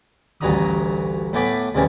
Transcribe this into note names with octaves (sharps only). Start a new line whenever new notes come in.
A1 D2 G2 F#4 A#5 D#6
A2 A3 B3 G#5 B5 D6
D2 C#3 E3 G3 C4